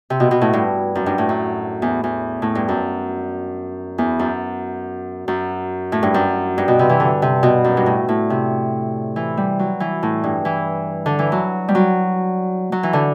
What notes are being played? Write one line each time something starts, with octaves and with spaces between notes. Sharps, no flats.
C3
B2
B2
A2
G2
F#2
G2
A2
F#2
E2
E2
A2
G2
F#2
E2
F#2
F#2
A2
G2
F#2
G2
B2
C3
E3
D3
C3
B2
F#2
G2
A2
A2
C3
E3
G3
F#3
E3
A2
G2
E3
D3
E3
F#3
G3
F#3
F#3
E3
D3